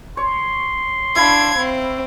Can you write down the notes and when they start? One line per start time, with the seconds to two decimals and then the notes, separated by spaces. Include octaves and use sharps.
0.17 C#5 C6
1.15 D4 E4 F5 B5 G#6
1.58 C4